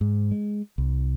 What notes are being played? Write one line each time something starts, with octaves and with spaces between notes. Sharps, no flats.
G#2
G#3
C2